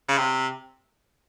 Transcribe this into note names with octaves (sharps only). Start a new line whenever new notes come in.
C#3
C3